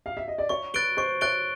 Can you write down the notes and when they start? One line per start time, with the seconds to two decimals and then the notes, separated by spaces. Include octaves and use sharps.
0.06 F5
0.17 E5
0.28 D#5
0.38 D5
0.49 C#5 C#6
0.74 B4 F#6 A6 D7 G7
0.97 C5 C#6
1.21 C#5 F#6 A6 D7 G7